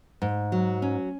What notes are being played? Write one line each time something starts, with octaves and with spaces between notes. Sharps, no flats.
G#2
F#3
C#4